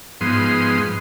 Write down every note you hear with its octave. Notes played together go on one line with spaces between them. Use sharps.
G#2 F3 B3 C6 D#6